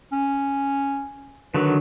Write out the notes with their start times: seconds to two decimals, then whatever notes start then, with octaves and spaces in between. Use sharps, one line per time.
0.12 C#4
1.54 D3 D#3 F#3 B4